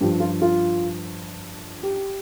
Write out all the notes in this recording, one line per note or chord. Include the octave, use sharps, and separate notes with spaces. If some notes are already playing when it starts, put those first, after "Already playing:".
G2 F3 G4
F4
F4
G4